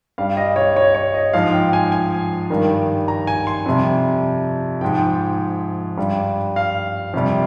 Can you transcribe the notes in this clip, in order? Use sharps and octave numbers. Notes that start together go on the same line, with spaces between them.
G2 G3 F5
D#5
C#5
C#5
C#5
D#5
G#2 F3 F5
G5
G#5
G#5
G2 D#3 G3
A#5
G#5
C6
F2 C3 G3
G#2 F3 G5
G2 G3
F5
F2 C3 G3